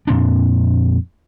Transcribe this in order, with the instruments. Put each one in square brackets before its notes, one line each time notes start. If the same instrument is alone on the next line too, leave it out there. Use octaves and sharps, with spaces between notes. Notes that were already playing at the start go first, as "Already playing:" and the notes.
[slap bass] F2 A#2 C4 D4